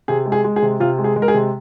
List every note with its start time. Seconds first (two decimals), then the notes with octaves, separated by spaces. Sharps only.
0.08 C3 G#4
0.26 G#3
0.32 G#4
0.44 G#3
0.56 G#4
0.62 C3
0.80 C3 F4
0.98 G#3
1.04 G#4
1.16 G#3
1.22 A#4
1.28 G#4
1.34 C3